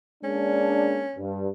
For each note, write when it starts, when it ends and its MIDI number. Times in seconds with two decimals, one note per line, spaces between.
0.24 1.05 56
0.24 1.05 58
0.24 1.18 61
0.24 1.05 62
1.17 1.47 43